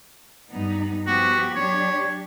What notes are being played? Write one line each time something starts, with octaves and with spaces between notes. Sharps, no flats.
G2 B3 D#4
F3 B3 F#4 G4
F#3 D4 G4 C#5